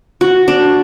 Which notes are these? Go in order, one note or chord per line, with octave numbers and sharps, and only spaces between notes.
F#4
D4